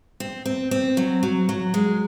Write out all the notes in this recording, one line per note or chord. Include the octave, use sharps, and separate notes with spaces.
C4
C4
C4
F#3
F#3
F#3
G#3